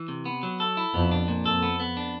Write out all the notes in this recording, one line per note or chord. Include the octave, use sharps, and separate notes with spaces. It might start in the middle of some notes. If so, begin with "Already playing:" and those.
Already playing: E3
C3
B3
F#3
A4
E4
F2 B3
D4
A#2
F2 A4
B3
B3
D4